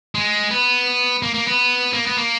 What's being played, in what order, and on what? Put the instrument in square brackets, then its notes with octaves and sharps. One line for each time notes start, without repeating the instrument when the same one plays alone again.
[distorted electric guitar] G#3
B3
A#3
A#3
B3
A#3
B3
A#3